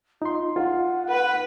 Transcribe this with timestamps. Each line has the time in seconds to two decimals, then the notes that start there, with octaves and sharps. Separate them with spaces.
0.22 D#4 F4 C6
0.56 F4 F#5
1.10 B4